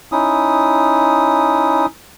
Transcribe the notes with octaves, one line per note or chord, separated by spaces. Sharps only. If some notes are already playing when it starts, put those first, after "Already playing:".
C#4 D#4 E4 D#6